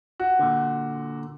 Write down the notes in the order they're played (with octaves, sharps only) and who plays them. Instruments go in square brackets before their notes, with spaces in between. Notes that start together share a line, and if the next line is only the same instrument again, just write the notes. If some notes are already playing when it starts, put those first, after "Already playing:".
[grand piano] F#4
[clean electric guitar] A#2 D3